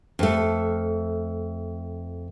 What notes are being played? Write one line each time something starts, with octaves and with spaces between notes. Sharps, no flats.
F2 A3